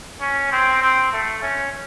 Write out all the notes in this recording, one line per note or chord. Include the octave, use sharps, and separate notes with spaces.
C#4
C4
C4
A3
C#4